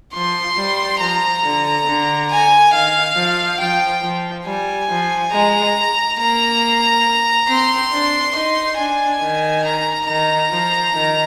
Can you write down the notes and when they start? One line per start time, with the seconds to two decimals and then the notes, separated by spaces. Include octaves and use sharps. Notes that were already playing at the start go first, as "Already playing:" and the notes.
0.14 F3 C6
0.57 G3
1.00 F3 A#5
1.44 D3
1.86 D3
2.31 G#5
2.73 D#3 F5
3.16 F3
3.60 F3 G5
4.02 F3
4.46 G3 G#5
4.89 F3
5.32 G#3 A#5
6.19 A#3 A#5
7.48 C4 C6
7.91 D4
8.35 D#4 C6
8.78 D4 G#5
9.21 D#3
9.65 A#5
10.07 D#3 A#5
10.51 F3
10.94 D#3